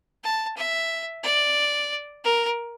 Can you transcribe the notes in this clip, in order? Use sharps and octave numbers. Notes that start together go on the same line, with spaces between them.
A5
E5
D5
A#4